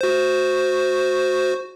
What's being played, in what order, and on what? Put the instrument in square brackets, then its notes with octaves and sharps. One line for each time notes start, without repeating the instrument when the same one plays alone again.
[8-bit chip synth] F#4 C5